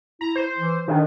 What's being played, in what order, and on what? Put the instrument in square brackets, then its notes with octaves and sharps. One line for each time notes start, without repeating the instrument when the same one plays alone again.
[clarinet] E4 [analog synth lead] A#5
[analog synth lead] C5
[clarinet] E3
[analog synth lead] D#3 [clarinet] D4